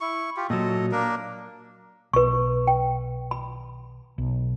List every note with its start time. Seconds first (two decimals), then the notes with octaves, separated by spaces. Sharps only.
0.01 E4 C#6
0.37 F4 G4
0.50 A#2 F#3 A4 D#5
0.92 A#3 D4 A#4
2.13 B1 B4 C#6
2.67 G5
3.31 B5
4.18 B1